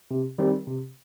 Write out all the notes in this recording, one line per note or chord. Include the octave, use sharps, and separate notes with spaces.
C3
D#3 G3 C4
C3